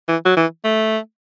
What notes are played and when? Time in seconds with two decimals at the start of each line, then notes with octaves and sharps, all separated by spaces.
0.08 E3
0.25 F#3
0.37 E3
0.64 A3